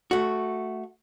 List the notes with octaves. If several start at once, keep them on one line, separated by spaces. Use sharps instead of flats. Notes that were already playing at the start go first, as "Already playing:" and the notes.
A3 F#4